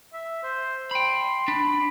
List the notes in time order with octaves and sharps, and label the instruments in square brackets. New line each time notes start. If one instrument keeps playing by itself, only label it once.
[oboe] E5
C5
[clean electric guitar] G5 B5 [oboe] C6
[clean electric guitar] D4 [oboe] B5